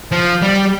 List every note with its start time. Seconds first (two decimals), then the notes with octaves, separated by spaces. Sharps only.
0.11 F3
0.42 G3